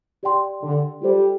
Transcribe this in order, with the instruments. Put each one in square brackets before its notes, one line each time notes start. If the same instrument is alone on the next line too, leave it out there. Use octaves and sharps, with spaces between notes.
[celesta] G4 D5 G5 C6
[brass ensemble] D3
[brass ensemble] G3 [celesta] F4 A4 C5